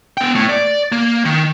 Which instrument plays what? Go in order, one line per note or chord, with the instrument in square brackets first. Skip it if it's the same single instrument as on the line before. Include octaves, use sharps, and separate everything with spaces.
[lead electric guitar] B3 G5
A2
D5
A#3
D#3